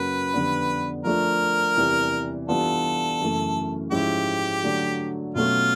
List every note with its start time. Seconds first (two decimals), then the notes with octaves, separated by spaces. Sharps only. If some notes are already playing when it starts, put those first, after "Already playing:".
Already playing: F#2 C#3 F#3 A#3 B4
0.34 F2 D3 G3 B3 D4
1.04 F3 A3 D4 F4 A#4
1.77 E2 C3 E3 G3
2.48 E3 G3 B3 D4 F4 A4
3.20 F#2 C#3 E3 A3
3.91 G#2 F3 G#3 C#4 E4 G4
4.63 D3 F#3 A3 D4
5.35 B2 F#3 A3 C#4 F4